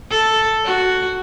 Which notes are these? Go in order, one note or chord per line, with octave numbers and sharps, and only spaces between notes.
A4
F#4